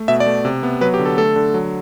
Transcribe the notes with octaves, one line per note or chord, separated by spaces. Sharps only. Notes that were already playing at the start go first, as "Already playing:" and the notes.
Already playing: A3
B2 E5
D5
A3
C3
B3
F#3 B4
G4
D3
A4
A3 A4
D3
F#3